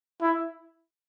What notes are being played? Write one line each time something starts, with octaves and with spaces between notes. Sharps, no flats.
E4